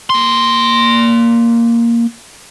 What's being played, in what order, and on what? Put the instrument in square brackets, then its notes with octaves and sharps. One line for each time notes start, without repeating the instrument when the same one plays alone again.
[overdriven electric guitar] A#3 C6